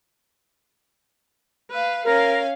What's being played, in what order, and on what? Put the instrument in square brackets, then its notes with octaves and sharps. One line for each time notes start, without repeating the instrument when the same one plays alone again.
[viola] B4 F5
[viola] C#4 F5 [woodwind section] A#4